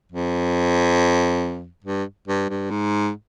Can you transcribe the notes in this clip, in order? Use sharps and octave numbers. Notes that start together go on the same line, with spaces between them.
F2
G2
G2
G2
G#2